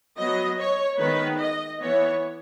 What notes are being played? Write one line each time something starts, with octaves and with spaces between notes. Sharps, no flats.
F#3 B3 D#5
C#5
D#3 G#3 B3 B4
D#5
E3 B3 C#5